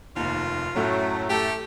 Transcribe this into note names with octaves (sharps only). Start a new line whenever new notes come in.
F1 D#2 F4
F#2 A2 F#3 A3
A3 G4 A4